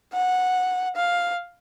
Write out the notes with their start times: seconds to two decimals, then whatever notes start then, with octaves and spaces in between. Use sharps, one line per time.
0.14 F#5
0.96 F5